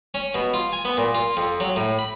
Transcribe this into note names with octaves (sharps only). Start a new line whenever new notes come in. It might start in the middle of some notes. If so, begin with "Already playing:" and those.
C#4
B2
F4
G#5
B3
A#2
F4
F2
F#3
A2
B5